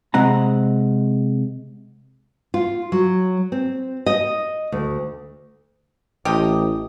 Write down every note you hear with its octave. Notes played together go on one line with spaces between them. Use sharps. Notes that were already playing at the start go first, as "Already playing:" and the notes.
C3 G#3 C4 F#5 A#5
F4
F#3
C4
D#5
D2
A1 G4 D#5